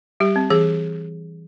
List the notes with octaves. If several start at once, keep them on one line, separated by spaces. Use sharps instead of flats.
G3 G4
C4
E3 G#4